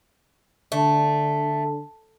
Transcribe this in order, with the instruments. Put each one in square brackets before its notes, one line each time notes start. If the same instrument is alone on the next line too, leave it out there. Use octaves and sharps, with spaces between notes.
[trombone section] D3 [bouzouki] A3